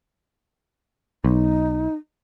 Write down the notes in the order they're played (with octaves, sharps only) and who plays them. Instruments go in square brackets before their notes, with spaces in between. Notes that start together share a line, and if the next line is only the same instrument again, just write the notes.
[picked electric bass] B1 [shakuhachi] D#4